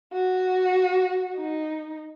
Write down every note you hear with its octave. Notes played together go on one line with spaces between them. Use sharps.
F#4
D#4